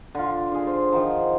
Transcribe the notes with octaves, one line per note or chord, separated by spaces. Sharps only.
D3 F4
D4 G#4
C5
D#3 F3 F#5 A#5